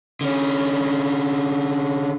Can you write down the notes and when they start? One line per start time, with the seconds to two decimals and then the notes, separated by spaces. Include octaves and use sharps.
0.21 D3 C#4